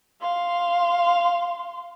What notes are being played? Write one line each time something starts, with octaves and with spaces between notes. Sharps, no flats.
F5 C6